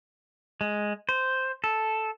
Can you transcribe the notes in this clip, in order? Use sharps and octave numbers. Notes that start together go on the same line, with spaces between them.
G#3
C5
A4